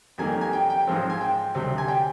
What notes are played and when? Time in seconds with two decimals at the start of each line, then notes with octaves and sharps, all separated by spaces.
0.18 F2 D#3 G3 A#3 G#5
0.41 G#5
0.53 G5
0.70 G5
0.87 G#2 F3 G#3 C4
1.10 G#5
1.21 G5
1.55 D2 C3 G3 C4
1.78 G#5
1.88 G5